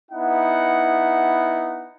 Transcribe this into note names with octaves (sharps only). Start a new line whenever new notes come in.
B3 D#4 E4 F#5